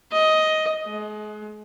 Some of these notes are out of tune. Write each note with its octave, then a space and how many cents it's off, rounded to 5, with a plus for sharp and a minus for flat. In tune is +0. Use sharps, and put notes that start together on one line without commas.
D#5 +10
G#3 +35